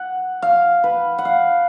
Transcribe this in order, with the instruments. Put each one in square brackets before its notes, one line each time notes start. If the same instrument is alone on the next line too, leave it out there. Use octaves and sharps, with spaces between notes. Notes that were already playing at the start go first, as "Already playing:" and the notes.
Already playing: [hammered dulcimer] F#5
F5
B4
F#5
F5